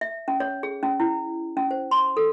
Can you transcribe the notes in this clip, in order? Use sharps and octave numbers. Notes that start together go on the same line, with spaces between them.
E5
C#4
C#5
G#4
C#4
E4
C#4
C5
C6
A4